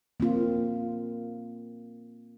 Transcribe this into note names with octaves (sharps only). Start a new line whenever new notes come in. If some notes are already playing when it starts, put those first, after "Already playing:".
A#3 C4 F4